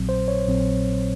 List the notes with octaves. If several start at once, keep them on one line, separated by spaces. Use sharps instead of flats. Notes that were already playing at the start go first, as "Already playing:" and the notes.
Already playing: A#1 A#2 F#3 C4
C5
C#5
A#1 A#2 F#3 C4